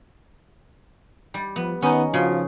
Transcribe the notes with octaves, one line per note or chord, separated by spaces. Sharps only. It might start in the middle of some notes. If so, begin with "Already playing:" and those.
G3
F3 B3
D#3 B3 C#4 D#4
C#3 F3 F#4